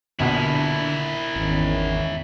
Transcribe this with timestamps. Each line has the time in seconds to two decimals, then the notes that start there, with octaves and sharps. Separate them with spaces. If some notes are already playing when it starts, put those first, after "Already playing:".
0.19 A#1 B2 D3 E4 A#4
1.36 G#1 E2 D#3 C#4